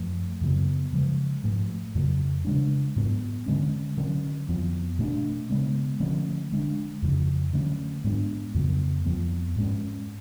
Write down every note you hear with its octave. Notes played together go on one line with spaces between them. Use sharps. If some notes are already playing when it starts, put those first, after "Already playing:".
Already playing: F#2 F3 A3
F#2 C#3 F#3 B3
C#3 F3 G#3
G#2 F3 A3
F2 C#3 F#3
C#3 G#3 D4
G#2 F#3 B3
D3 G#3 C#4
D3 F#3 C#4
F2 F3 B3
B2 A3 D4
C#3 G#3 B3
D3 F3 A3 C#4
D3 G#3 D4
F2 C#3 F3
D3 F#3 A3 C#4
G#2 G#3 B3 D4
F2 C#3 F#3 B3
F2 F3 B3
G#2 G#3 C#4